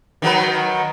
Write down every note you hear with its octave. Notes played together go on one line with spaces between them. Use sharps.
D#3 F#3 B4